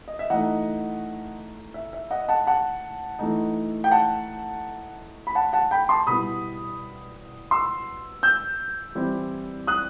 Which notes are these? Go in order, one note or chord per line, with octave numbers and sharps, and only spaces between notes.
D#5
E5
E3 A3 D#4 D#5 F#5
E5
E5
D#5 F#5
F#5 A5
F#5 A5
E3 A3 D#4
G5
F#5 A5
B5
F#5 A5
F#5 A5
G5 B5
A5 C6
B2 G3 B3 E4 B5 D#6
C6 E6
E6 G6
E3 G3 C4 E4
D#6 F#6